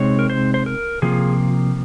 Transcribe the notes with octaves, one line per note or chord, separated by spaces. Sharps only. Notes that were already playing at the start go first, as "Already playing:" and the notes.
Already playing: C3 G#3 C4 D#4 C#5
A#4
C5
C5
A#4
C3 F3 A#3 F4 G#4